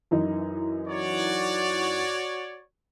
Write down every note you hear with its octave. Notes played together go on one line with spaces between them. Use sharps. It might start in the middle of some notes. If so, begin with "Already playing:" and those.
F#2 E3 D#4
F#4 C#5 D5